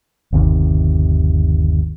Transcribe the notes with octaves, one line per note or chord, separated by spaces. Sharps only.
G1 D#2 C3 D#3